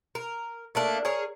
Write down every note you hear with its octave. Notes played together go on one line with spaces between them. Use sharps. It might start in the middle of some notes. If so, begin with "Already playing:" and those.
A#4
A3 A#3 D4
G#4 A#4 C#5